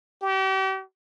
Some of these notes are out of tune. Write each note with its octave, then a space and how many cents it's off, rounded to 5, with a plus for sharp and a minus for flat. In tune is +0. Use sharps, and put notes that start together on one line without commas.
G4 -40